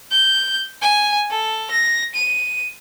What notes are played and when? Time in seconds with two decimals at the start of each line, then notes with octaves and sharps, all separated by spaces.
0.11 G6
0.82 G#5
1.31 A4
1.71 A#6
2.15 D#7